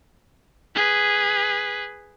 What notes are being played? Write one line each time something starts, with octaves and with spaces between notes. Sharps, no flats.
G#4 B4